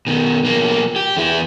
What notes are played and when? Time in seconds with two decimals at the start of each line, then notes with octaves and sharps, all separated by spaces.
0.07 B2 D#3
0.43 B1 A#3
0.96 G4
1.16 E2 E4